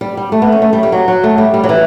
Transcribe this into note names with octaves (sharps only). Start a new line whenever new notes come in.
G3
G3
A3
B3
C#4
A3
G3
G3
F#3
F#3
A3
G3
G3
F#3
E3